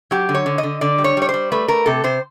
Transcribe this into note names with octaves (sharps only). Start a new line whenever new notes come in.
F#3 G4
D3
C#5
D3
D#5
D3
D3 D5
G3
C#5
G3 C#5
C5
G3
A3 B4
A3 A#4
C3 A4
C3 C5